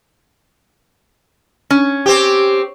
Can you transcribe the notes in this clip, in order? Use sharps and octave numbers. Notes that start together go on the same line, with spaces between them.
C#4
C4 G4